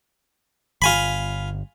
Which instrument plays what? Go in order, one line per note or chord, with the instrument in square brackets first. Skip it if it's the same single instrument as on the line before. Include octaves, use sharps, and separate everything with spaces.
[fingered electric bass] G1 [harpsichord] F4 G#5 B5